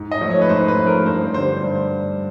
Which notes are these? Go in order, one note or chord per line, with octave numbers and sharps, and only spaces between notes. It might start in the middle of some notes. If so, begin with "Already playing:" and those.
Already playing: G#2
D#5
F3 A3 C#4
C#5
B4
G#2 C5
B4
F3 A3 C#4
A#4
G2 C5
D3 G3 C5
G2